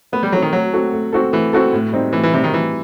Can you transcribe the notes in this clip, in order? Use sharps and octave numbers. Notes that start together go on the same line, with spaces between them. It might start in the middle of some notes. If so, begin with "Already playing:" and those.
A3 B3
G3
F#3 C4 F#4 A4
D#3
F#3 A3
C4 F#4 A4
A3
C4 F#4 A4
E3 A3
C4 F#4 A4
A2
G3 C4 D#4
A2 E3
E3
C3 G3 C4 D#4
D#3
A2 E3